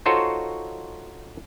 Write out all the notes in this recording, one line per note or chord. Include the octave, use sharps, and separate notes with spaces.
D#4 F4 F#4 A4 C5 C#5